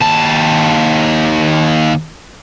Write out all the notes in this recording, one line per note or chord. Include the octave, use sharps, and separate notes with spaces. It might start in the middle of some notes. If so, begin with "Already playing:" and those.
D#2 A5